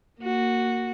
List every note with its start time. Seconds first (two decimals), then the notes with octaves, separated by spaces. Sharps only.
0.20 A#3 F#4